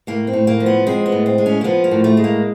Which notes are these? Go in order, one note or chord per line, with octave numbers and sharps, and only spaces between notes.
A2 A#3
C4
A2
A#3
F3
B3
G#3 C4
B3
A2
C4
G#3
C#4
A#3
F3 B3
A#3
A2
A3
G#3
A#3